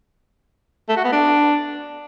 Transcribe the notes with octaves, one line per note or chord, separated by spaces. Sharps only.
A3
F#4
B3
D4